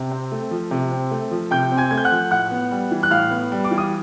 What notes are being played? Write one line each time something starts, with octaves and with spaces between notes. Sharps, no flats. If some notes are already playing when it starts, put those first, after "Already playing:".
Already playing: C3
C4
A3
F3
C3
C4
A3
F3
C3 G5 G6
C4
G#5 G#6
A3 G#6
G6
F#5 F#6
F3
A2 F#5 F#6
B3
G3
E3
F#6
A2 F5 F6
B3
G3
D6
E3
D#6